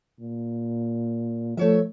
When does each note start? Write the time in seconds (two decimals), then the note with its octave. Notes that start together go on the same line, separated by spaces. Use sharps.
0.20 A#2
1.57 F3 A3 C#5 E5